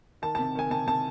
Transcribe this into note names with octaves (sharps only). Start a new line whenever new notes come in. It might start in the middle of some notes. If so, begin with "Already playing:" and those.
D#3 A5
C3 A5
D#3 G#5
C3 A5
C3 A5